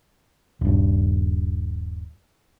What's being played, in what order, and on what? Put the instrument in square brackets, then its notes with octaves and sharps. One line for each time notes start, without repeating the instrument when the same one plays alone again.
[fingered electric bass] D#1 G2